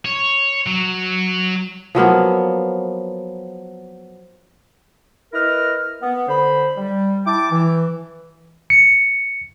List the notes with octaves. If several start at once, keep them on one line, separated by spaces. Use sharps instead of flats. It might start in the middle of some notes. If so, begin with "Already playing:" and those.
C#5
F#3
F3 F#3 A#3 B3
E4 A#4 B4 D#5 F6
B3
D3 C5 B5
G3
E4 G5 A5 D6
E3
C#7